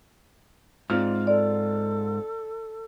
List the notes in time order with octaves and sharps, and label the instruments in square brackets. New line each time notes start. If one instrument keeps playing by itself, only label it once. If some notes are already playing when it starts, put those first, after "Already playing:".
[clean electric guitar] G#2 [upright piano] C4 F4 F6 [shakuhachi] D5
[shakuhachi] A4 [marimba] D5